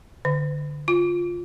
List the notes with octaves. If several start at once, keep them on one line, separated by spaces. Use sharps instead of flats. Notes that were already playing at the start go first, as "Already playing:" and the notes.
D3
F4